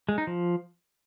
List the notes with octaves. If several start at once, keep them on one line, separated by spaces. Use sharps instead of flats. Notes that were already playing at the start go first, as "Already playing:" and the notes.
G#3
D#4
F3